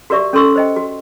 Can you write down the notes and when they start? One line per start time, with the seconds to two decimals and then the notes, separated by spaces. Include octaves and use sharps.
0.10 F#4 G4 A#4 D5 E5 C#6
0.33 C#4 A4 A#4 C6 C#6 E6
0.55 C5 D#5 G5
0.76 F#4